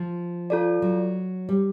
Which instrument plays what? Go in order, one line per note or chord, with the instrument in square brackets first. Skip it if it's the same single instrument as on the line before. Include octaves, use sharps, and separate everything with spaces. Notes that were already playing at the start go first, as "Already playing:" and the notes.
Already playing: [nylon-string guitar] F3
[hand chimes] F4 A4 D5
[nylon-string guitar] F#3
G3